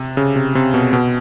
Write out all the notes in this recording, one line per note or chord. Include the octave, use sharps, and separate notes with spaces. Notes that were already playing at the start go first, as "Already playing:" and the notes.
Already playing: C3
C#3
C3
C3
B2
B2